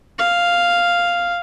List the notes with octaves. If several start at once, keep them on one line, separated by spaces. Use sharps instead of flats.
F5